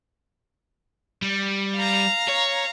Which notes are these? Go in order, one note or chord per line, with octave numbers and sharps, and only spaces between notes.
G3
F5 A#5
C#5